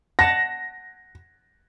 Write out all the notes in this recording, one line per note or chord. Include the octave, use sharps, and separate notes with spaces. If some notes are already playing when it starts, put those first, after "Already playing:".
F#5 A5 A#6